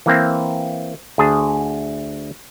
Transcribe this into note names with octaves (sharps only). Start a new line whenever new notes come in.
E3 A#3 C4
D2 G#4 A5